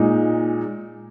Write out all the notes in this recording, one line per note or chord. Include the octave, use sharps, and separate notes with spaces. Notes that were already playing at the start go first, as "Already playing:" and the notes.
Already playing: A#2 G#3 D#4